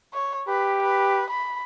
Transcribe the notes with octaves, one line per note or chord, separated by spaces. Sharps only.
C#5
G4 B4
B4
B5